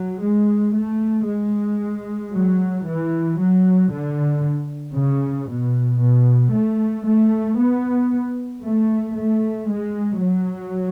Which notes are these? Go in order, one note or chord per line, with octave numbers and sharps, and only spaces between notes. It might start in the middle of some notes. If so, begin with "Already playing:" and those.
Already playing: F#3
G#3
A3
G#3
F#3
E3
F#3
D3
C#3
B2
B2
A3
A3
B3
A3
A3
G#3
F#3